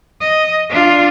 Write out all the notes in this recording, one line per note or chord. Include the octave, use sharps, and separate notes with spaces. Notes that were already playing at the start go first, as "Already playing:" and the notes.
D#5
D4 F4